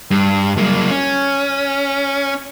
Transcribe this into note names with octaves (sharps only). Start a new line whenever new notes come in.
G2
F#3 A#3
C#4